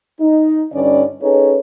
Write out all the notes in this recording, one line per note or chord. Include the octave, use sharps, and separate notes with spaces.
D#4
G2 D3 C#4 D#4 D5
C#4 D#4 G#4 A4 B4 C#5